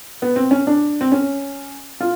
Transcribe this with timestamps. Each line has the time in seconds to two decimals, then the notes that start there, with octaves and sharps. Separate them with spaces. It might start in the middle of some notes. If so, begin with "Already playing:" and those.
0.22 B3
0.36 C4
0.51 C#4
0.67 D4
1.01 C4
1.12 C#4
2.00 F4